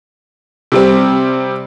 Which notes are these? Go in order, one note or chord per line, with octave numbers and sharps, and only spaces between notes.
C3 G3 C4